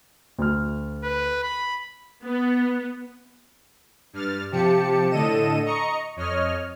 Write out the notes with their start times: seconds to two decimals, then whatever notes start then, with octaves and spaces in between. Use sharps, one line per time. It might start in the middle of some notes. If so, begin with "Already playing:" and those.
0.39 D2 F6
1.04 B4
1.43 B5
2.23 B3
4.13 G2 F6 A6
4.51 C3 F3 G4 A5 C#7
5.10 A2 D3 A4 D#5 D#7 E7
5.65 D#5 A#5 C#6 C#7
6.16 F2 C#5 D#5 F6